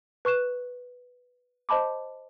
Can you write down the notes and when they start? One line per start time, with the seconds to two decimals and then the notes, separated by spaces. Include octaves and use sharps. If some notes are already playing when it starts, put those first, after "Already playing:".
0.25 B4 C#6 F#6 E7
1.69 C5 D#5 A5 B5 D6